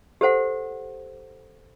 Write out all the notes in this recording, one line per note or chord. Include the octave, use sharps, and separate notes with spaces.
G4 A4 C5 F#5